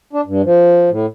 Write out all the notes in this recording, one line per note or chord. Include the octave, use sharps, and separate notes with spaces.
D4
G2
F3
A2